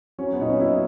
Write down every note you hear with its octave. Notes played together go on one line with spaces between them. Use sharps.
F#3 C#4
B3
A#2 D#4
C#4
F#3 E4
D#4